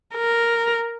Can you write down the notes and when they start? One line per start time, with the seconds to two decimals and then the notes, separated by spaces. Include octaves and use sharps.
0.15 A#4